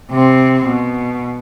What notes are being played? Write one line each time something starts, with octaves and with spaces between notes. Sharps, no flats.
C3 C4
B2